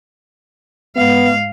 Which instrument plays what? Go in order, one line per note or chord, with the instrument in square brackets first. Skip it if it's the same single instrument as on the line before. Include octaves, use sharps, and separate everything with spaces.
[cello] G#2 F5 [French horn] B3